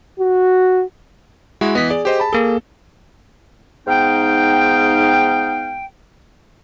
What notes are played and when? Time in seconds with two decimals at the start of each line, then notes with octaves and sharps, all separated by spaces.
0.19 F#4
1.61 G#3 E4 F#4
1.75 E3 B3 D#5 B6
1.90 G#4 D5
2.05 G4 C5 D#5
2.20 A5 B5
2.33 A#3 G#4 A4
3.87 G#2 B3 D#4 F5 G5